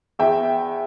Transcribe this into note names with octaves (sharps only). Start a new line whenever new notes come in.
E2 E5 G5